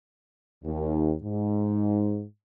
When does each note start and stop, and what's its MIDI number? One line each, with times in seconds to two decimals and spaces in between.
0.64 1.14 39
1.23 2.24 44